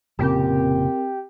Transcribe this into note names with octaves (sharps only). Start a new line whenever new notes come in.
F1 A#2 C#3 C4 G4 A#4